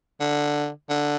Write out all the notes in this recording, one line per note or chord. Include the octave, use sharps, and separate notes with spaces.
D3
D3